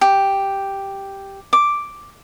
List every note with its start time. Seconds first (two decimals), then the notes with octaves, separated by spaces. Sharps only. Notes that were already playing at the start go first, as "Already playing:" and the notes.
0.01 G4
1.53 D6